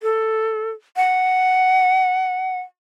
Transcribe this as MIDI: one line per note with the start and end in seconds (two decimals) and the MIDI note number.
0.02 0.70 69
0.96 2.60 78